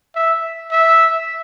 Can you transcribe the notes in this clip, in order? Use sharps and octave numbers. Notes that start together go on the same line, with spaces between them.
E5
E5